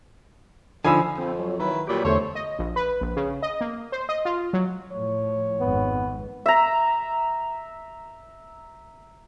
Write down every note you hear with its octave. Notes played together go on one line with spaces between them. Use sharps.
D3 F3 D#4 G#5 B5 E6
F2 C4
F#3
D#3 E4 B4
A#2 F#3 G3 G4
E2 D3 A3 C5 C#5
D#5
A#1
B4
A#1
C#3
D#5
A#3
C5
D#5
F4
F#3
A2 F3 C#5
G#1 F2 G#2 B3
E5 A#5